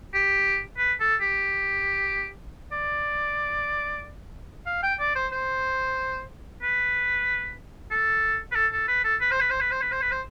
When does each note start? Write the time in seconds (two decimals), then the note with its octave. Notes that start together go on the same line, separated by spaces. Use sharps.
0.14 G4
0.78 B4
1.00 A4
1.21 G4
2.72 D5
4.66 F5
4.83 G5
5.00 D5
5.15 C5
5.32 C5
6.62 B4
7.91 A4
8.52 B4
8.55 A4
8.73 A4
8.88 B4
9.04 A4
9.21 B4
9.31 C5
9.40 B4
9.50 C5
9.60 B4
9.71 C5
9.81 B4
9.92 C5
10.02 B4
10.11 C5